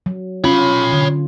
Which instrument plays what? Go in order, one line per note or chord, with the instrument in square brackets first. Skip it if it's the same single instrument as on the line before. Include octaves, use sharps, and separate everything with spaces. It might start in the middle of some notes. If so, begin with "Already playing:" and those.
[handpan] F#3
[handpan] C#4 F4 [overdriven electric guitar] C#5 B5
[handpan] D3